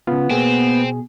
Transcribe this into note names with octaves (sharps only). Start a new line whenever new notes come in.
C#2 C#3 B3 F4
B2 A#3 C4 G#4